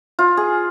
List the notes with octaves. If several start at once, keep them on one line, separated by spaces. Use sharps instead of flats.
F4
G#4